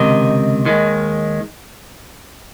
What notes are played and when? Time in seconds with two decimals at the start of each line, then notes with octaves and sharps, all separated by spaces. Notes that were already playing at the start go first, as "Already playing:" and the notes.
Already playing: C#2 C3 D#3 D#5
0.65 D#2 D#3 G#3